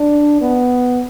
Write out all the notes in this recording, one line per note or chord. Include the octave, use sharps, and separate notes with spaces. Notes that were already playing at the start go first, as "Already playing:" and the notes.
Already playing: D4
B3